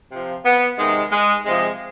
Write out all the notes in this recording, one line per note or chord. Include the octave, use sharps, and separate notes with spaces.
C3 F3
B3
C3 D#3 G#3
G#3
C3 F3 G#3